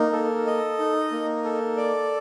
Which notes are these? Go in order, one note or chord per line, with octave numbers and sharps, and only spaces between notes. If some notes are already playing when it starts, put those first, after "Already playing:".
Already playing: A#3 D#4
A4
D#5
D#4
A#3
A4
D5